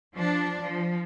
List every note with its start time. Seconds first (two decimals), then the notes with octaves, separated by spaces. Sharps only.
0.15 F3 D4
0.62 F3